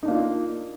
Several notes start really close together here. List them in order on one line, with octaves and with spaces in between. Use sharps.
D#4 D4 A#3 F4